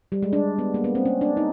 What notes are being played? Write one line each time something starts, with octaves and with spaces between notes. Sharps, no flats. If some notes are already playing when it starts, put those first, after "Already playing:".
G3
G#3
D4
B3
A#3
B3
C4
C#4
D4
D#4